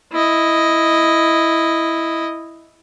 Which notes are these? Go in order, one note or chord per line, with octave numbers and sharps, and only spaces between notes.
E4 D#5